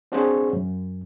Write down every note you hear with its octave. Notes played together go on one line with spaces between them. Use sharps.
C4 D4 F#4 G#4 C5 C#5
F#2